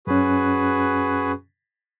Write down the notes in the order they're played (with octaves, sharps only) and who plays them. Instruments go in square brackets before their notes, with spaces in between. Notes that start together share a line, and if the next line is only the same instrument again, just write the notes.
[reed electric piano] F#2 C#4 [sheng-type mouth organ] F#4 G#4 B4